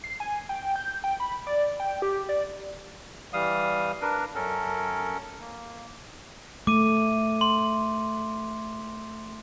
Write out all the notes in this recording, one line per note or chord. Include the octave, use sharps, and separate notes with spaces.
C7
G#5
G5
G6
G5
B5
D5
G5
G4
D5
E3 G3 F5 D#6
D4 A#4 B4
F#2 C#4 A4 A#4
A#3
A3 D6 D#7
C6